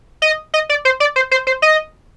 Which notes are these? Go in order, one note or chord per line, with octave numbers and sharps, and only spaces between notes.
D#5
D#5
D5
C5
D5
C5
C5
C5
D#5